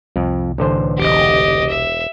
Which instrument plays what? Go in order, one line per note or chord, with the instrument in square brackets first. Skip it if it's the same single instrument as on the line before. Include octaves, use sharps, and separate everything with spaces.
[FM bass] C2 [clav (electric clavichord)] F2
[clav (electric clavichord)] A1 D3 C5
[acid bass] E1 [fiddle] G4 D#5
[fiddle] E5